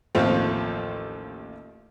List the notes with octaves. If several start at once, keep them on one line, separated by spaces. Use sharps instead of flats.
A1 D#2 F3 A3 C4